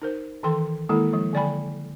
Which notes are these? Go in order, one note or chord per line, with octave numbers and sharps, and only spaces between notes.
D#4 A#4 C5
D#3 E3 A4 G5 C6
D#3 G#3 A#3 E4 A4
F3 G#3
D3 F#3 D5 G5 G#5 B5